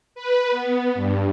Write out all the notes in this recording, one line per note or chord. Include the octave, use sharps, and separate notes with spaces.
B4
B3
G2